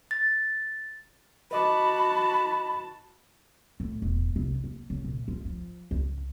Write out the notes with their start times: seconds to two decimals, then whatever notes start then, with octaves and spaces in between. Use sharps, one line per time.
0.11 A6
1.51 F#4 B4 D#5 A5 B5 D6
3.80 A2
4.02 E1
4.36 C2
4.64 A#3
4.90 C#3
5.05 A#2
5.28 F3
5.45 F3
5.91 C#2